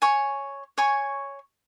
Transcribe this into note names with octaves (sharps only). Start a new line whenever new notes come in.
C#5 G#5 C#6
C#5 G#5 C#6